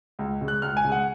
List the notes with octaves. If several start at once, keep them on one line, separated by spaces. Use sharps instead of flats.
C#2
C#3 G#3
F#6
C#2 F6
G#5
C#3 G#3
F#5